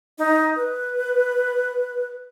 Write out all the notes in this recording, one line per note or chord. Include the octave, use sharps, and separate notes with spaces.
D#4
B4